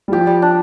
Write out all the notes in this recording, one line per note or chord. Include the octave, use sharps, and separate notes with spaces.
G3
F3 G4
G3
D4